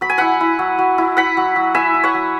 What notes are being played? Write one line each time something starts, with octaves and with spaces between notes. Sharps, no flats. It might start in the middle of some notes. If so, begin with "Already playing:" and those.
F#3 B5
G#5
E4 F#5 B5
E4
F#3
F#3
E4
E4 F#5 B5
F#3
F#3
E4 E5 G#5
E4
C#5 F#5
F#3